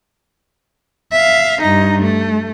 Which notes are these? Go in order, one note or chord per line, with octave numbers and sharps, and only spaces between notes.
E5 F5
G2 D#4
A3